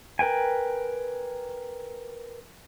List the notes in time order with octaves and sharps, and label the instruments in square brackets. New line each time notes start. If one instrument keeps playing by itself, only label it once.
[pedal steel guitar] A#4 B4 G5 G#5